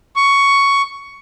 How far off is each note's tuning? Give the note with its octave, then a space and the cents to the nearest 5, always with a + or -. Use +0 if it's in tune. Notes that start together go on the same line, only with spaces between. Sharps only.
C#6 +10